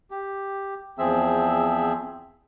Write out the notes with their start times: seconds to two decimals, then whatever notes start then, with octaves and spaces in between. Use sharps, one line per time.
0.11 G4
0.98 E2 F3 C4 G#4 E5 E6